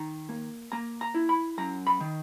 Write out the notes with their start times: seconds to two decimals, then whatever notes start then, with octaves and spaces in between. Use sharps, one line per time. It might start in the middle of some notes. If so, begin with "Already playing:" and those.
Already playing: D#3 A#5
0.29 A#3
0.72 A#3 A#5
1.01 A#5
1.14 E4
1.29 B5
1.58 F#2 A#5
1.87 B5
2.00 D#3